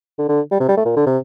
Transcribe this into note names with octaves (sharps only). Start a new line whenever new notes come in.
D3
D3
G3
C3
G3
A3
A#2
D3
C3